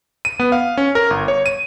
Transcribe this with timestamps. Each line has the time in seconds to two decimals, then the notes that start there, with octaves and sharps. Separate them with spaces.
0.25 D#7
0.40 B3
0.52 F5
0.77 C#4
0.95 A#4
1.10 G1
1.28 C#5
1.46 D#7